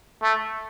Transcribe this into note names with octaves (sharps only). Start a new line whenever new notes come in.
A3